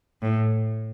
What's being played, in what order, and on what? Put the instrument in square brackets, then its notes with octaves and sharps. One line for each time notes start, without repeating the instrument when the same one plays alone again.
[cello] A2